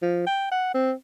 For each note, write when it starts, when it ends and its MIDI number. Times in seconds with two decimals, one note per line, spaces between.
0.02 0.24 53
0.26 0.47 79
0.51 0.74 78
0.74 0.92 60